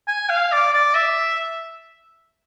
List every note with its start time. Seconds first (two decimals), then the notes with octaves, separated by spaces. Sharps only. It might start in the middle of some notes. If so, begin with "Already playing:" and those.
0.08 G#5
0.30 F5
0.52 D5
0.74 D5
0.95 E5